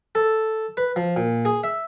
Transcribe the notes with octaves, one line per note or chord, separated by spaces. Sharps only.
A4
B4
F3
A#2
G#4
E5